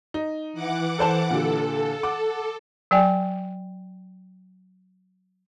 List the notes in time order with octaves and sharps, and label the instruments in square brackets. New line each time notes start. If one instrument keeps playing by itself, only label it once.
[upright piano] D#4
[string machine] E3 F#5 D6
[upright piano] A4 C5 A5
[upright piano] A#2 D3 G4 [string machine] A4
[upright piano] F#5 D6
[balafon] F#3 D5 G5 G#5